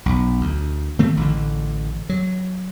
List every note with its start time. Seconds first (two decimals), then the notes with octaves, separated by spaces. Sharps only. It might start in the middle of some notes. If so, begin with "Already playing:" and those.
0.06 B1
0.41 D2
0.99 D#3 A3 C4
1.17 A1 D3
2.09 F#3